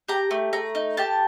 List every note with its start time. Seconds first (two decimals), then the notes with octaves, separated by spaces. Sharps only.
0.08 G4 A#5
0.31 A3
0.53 A3 A#5
0.75 D#4
0.97 G4 A5